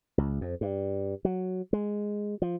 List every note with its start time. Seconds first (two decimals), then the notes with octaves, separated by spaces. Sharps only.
0.18 C#2
0.41 F2
0.61 G2
1.25 F#3
1.73 G#3
2.42 F3